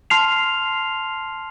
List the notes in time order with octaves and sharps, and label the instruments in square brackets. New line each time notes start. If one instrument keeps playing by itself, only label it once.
[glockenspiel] A5 C6 F6 C7 F7